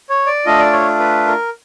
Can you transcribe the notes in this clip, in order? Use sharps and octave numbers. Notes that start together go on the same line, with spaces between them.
C#5
D5
A3 D4 F4 D#5
D5
C#5
B4
A#4